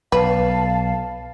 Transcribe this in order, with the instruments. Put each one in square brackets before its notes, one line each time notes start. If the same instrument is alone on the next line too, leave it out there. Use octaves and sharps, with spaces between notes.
[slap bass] B1 [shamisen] B4 [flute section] F5 A5